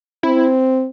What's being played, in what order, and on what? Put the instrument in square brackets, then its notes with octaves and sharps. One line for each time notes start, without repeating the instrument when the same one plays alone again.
[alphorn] C4 [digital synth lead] E4